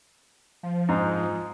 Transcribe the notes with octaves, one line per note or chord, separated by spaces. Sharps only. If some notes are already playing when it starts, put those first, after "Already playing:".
F3
G#2 D#4